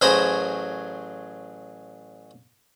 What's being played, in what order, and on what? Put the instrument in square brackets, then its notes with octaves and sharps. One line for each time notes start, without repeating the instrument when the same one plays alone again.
[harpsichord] A1 F#3 G#4 C5 A#5 B5